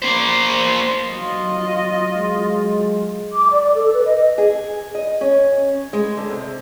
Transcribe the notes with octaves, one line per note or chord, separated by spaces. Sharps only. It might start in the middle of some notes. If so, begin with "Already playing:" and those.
A#3 C5
F#3 F4 D#5
G#3
D6
D5
A4
B4
D#5
G#4
D#5
C#4
G#3
D3
C3